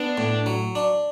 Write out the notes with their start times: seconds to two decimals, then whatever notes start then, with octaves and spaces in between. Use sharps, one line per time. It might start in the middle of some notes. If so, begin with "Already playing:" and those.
Already playing: B3 D4
0.18 A2
0.46 F#3
0.75 D4